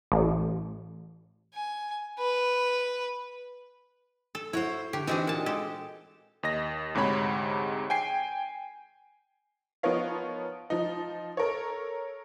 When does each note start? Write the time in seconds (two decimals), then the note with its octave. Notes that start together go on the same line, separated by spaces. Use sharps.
0.12 A1
1.54 G#5
2.19 B4
4.35 A4
4.53 E4 F#4 C5 C#5
4.93 D3 G4
5.07 E3 C4 D4 D#4 F#4 D#5
5.27 A#2 A5
5.46 G#3 G4 A4
6.43 D#2 D#5 A#6
6.95 D2 G#2 C3 G#3 C#5 B5
7.90 G5 G#5 C7
9.83 F3 B3 D#4 A#4 C#5 F5
10.70 F3 D#4
11.37 A4 A#4 C#5